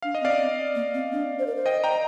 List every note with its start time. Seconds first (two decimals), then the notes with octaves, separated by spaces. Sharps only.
0.02 D4 F5
0.15 D#5
0.21 C4
0.25 D5 F5
0.39 C4
0.75 A#3
0.94 C4
1.12 D4
1.39 C5
1.46 A#4
1.56 C5
1.66 D#5 G5
1.84 G5 A#5